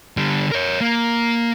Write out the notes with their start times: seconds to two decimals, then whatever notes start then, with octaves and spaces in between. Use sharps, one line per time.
0.17 D3 G3
0.52 A#4 C#5
0.81 A#3